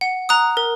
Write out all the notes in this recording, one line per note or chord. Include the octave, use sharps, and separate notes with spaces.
F#5
A#5 D#6 F#6
A#4